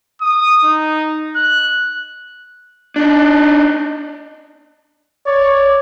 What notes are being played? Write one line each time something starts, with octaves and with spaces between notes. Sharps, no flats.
D#6
D#4
F#6
D4 D#4
C#5 D5